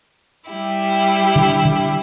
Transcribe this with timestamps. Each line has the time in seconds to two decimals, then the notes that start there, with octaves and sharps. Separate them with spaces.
0.50 G3 E4 G4
1.36 D3
1.65 D3